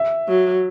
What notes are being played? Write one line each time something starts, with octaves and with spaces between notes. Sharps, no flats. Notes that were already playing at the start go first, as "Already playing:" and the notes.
Already playing: E5
F#3